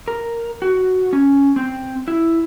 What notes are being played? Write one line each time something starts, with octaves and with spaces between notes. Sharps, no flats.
A#4
F#4
C#4
C4
E4